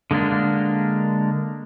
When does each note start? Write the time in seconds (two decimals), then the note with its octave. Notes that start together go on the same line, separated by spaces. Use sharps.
0.11 D3 G#3 A#3 D4